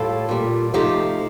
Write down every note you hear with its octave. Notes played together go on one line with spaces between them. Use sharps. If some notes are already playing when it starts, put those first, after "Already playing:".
Already playing: A2 G3 F4 A4
A#2 G3
C3 F3 A3 D#4 G4